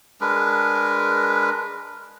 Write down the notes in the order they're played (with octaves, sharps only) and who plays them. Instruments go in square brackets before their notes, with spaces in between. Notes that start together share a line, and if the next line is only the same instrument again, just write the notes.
[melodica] G#3 D4 A#4 B4